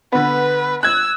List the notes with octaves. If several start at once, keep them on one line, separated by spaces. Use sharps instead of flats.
D3 B3 B4
E6 F#6 G#6